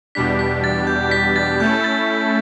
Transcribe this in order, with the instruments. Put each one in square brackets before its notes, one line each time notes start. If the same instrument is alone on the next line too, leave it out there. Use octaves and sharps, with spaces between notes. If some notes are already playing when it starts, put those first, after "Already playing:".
[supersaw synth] E2 B2 G3 D4 G4 [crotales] B6
[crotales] B6
A6
G6
B6
A6
[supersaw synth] A3 C#4 E4 A4 [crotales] G6
[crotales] A6